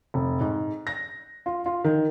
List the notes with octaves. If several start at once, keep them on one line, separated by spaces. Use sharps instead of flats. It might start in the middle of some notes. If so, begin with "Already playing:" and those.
F1
G#2
A#6
F4
F4
D#3